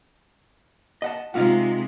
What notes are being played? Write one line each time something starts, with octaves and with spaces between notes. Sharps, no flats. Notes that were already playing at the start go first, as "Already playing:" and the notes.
D#5 F#5 A5
C3 G#3 D#4 F4 F5 F#5